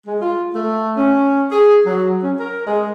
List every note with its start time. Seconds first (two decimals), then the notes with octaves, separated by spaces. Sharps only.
0.06 G#3
0.21 F4
0.54 A3
0.97 C#4
1.51 G#4
1.86 F#3
2.22 C#4
2.39 A#4
2.67 G#3